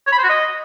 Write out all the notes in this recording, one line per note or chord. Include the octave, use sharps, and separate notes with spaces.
C#5
B5
C5
F#4
D#5